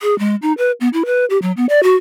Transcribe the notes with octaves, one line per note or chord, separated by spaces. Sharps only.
G#4
G#3
D#4
B4
B3
E4
B4
G4
F#3
B3
D5
F#4